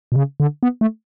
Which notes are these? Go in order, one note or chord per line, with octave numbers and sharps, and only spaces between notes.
B2
C#3
D3
B3
A3